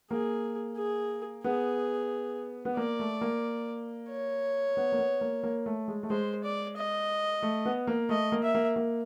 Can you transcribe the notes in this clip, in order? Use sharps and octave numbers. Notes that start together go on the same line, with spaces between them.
A#3 G#4
G#4
B3 G#4
B3
A#3 D5
A3
A#3
C#5
B3
A#3
B3
A#3
A#3
A3
G#3
A3
G#3 C5
D5
D#5
A3
B3
A#3
A3 D#5
A#3
E5
A#3
A#3